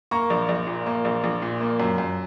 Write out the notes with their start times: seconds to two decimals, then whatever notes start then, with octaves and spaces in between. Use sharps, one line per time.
0.11 A#3 A#5 C#6
0.30 A#1
0.49 A#1
0.67 A#2
0.86 A#3
1.05 A#1
1.24 A#1
1.42 A#2
1.61 A#3
1.80 F#2
1.98 F#2